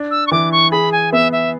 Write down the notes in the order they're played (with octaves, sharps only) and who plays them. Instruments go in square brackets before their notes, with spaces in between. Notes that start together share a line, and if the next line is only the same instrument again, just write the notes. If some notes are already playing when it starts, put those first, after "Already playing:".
Already playing: [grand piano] D4
[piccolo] E6
C#6
[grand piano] E3 [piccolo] D6
[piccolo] C#6
[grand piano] G#4 [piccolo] B5
[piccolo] G#5
[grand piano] B3 [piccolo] E5
[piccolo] E5